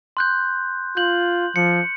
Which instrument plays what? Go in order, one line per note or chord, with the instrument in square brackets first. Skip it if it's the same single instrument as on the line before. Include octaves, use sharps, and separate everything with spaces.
[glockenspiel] C6 F#6 G6
[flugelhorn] F4 [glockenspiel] G6 F#7
[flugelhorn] F3 [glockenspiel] C#7